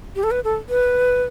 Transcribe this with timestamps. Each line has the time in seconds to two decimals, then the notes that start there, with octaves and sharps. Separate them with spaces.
0.16 G4
0.23 A4
0.31 B4
0.44 A4
0.69 B4